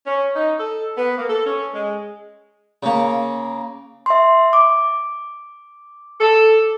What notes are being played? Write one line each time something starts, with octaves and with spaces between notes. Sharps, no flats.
C#4
D#4
A4
B3
A#3
A4
C#4
G#3
C#3 A#3
E5 C6
D6
A4